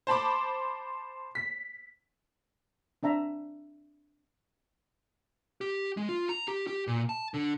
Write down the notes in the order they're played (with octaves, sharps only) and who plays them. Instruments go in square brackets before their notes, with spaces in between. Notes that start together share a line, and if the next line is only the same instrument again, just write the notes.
[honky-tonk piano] C5 A5 B5 D6
B6
[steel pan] C4 D4 E5 A#5
[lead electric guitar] G4
G#3
F4
A#5
G4
G4
A#2
A5
D3